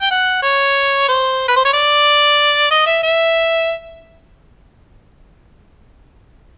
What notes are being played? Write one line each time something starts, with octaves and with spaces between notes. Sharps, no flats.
G5
F#5
C#5
C5
B4
C5
C#5
D5
D#5
E5
E5